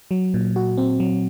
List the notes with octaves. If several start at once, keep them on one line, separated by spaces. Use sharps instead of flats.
F#3
A#2
F#4
C4
F#3